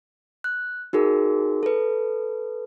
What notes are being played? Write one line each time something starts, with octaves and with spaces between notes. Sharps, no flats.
F#6
D#4 F#4 G#4 A#4
A4 B4